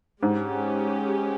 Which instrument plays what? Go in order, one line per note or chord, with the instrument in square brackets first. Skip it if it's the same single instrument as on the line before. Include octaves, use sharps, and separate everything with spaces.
[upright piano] G#2 [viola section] G#3 C#4 G4